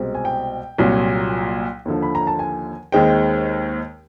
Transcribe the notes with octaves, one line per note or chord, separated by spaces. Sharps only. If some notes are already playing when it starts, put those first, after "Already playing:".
Already playing: C2 B2 G#3 C4
G#5
G5
C2 A#2 F#3
D#2 D3 F3
B5
A#5
A5
G#5
D#2 D#3 G#3 C4 G5